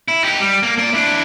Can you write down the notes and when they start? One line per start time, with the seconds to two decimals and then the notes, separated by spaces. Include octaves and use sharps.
0.08 E4
0.23 D#4 G4
0.41 G3
0.63 A#3
0.78 A#3 D5
0.93 D4 E4